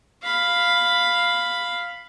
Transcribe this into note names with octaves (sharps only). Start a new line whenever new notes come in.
F5 B5